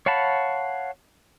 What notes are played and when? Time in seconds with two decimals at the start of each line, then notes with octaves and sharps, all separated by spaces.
0.06 C#5 F5 F#5 A5 B5